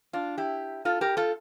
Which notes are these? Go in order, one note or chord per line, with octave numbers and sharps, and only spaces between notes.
D4 F4
E4 G4
F4 A4
G4 A#4
F4 A4